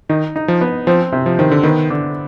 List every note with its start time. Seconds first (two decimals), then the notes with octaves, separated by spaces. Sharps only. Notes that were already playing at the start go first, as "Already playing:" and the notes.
0.09 D#3 D#4
0.36 D#4
0.48 F3
0.61 B3
0.87 F3 C4
1.12 C3
1.26 F3
1.39 D#3 C4
1.51 D3
1.63 D#3 B3
1.90 D3